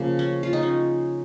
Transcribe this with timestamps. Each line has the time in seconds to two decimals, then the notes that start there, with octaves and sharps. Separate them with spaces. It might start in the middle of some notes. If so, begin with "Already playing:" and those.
Already playing: C#3 F3 A#3
0.19 C#4
0.43 F4
0.53 D#4
0.63 C#4